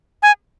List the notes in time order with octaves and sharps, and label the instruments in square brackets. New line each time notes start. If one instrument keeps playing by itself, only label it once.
[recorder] G#5